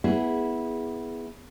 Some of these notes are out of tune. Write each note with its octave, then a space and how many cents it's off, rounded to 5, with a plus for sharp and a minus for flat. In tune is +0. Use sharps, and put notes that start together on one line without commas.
B3 +0 E4 -15 G#4 +0